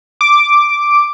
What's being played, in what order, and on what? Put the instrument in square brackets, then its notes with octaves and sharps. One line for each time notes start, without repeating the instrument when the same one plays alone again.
[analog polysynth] D6